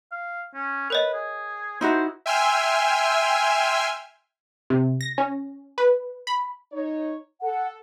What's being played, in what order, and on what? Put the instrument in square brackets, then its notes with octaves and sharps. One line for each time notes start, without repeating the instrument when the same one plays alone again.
[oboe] F5
C#4
[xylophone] A#4 C#5 D#5 [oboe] B4
[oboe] G#4
[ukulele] D#4 E4 F#4 [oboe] C5
[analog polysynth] E5 G5 G#5 C6 E6 F6
[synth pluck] C3
A#6
C#4
B4
B5
[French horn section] D#4 C#5
[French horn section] A4 [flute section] F#5